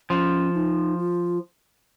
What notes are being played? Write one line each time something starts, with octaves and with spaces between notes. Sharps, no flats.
F3 C#4
D#4
F4